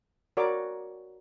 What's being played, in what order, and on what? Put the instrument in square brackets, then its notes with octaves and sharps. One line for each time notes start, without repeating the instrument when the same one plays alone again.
[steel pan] F#4 A#4 C#5 D5 D6